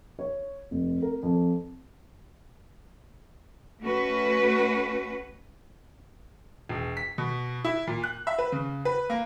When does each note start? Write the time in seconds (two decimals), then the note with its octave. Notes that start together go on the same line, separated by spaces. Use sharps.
0.19 C#5
0.71 F1
1.02 A#4
1.23 F2
3.82 A3 C#4 F#4 B4
6.69 E1
6.97 B6
7.18 B2
7.65 E4
7.87 A#2
8.03 F#6
8.27 E5
8.39 B4
8.52 C#3
8.85 B4
9.10 A#3